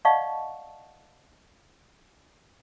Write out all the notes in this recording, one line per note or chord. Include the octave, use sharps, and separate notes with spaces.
D5 D#5 F5 F#5 A5 C#6